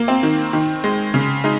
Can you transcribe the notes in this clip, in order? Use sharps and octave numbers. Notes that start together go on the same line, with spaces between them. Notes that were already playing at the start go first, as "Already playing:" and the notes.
Already playing: A#3
C4
D#3
D#3
G#3
C#3
G#3 D#4